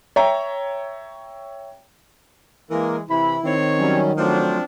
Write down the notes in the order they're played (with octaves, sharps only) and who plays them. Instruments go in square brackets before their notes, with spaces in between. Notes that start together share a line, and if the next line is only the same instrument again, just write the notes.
[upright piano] C#5 E5 G5 A#5
[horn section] E3 G#3 [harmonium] A#3 A#4
[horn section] C3 E3 B5 [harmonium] E4
[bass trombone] D#3 [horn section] C4 C#5
[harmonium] F#3 G3 C#4
[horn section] F3 C4 D4 [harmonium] F#3 A3 C5